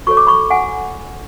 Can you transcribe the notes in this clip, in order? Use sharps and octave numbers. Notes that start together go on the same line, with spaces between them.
F#4 A4 C#5 C#6
D6
B5 C#6
F#5 G#5